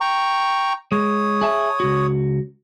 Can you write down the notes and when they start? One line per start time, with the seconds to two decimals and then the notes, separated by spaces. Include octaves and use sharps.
0.01 G5 A#5 C#6
0.92 G#3 C#5 D#6
1.41 G#4 E5 A5
1.80 C#2 F#4